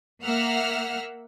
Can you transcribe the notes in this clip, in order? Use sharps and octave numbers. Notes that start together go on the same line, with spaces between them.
A#3 E5 F#5 E6 F6